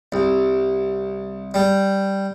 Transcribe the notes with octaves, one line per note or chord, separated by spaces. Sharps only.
C2
G3